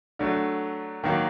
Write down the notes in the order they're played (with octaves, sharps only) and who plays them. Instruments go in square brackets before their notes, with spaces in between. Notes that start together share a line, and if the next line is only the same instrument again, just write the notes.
[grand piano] D3 F#3 A3
D#3 F#3 A#3